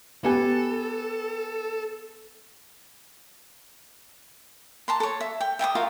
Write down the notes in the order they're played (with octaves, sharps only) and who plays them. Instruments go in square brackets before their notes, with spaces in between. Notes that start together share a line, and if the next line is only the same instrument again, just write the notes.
[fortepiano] B3 G4 G#5 [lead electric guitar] A4
[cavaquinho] A5 A#5 C6
A4 C#5
E5
G5
E5 G5 A5 D#6
F4 F#4 A#4 F5